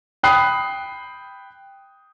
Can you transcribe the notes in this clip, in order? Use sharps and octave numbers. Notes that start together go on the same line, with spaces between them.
G5 B5 D#6 F#6 C7